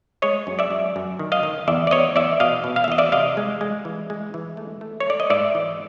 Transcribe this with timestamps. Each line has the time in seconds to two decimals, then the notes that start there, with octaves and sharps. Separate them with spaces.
0.22 G#3 C#5 D#5
0.47 F#2
0.59 D5 E5
0.71 F#2
0.96 F#2
1.19 D#3
1.32 D#5 F5
1.43 D#3
1.68 E2 D5 E5
1.87 D5
1.91 B3 C#5 D#5
2.15 E2 D5 E5
2.40 B2 D#5 F5
2.64 B2
2.76 F5
2.84 E5
2.88 E2 D#5
2.98 D5 E5
3.12 C3 D#5 F5
3.37 G#3
3.61 G#3
3.85 E3
4.10 G#3
4.34 E3
4.57 A3
4.81 A3
5.00 C#5
5.07 A3 D5
5.20 D#5
5.30 G#2 D5 E5
5.55 E3